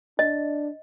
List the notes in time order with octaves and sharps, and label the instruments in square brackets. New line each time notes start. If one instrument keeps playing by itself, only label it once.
[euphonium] D4 [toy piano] D#5